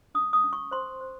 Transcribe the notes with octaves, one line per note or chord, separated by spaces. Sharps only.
C#4 D#6
D#6
C#4
C#6
C5 C6
C5